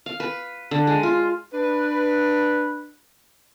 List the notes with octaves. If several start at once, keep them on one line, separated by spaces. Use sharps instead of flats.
F5
B4
D3
G#3
F4
D4 B4